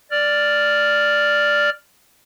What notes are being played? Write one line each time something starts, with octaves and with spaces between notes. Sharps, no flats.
D5 F6